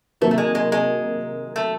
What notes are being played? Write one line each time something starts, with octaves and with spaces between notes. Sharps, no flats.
C3 D#3 F#3 A3 A#3
A3
G#3
G#3
G#3
A3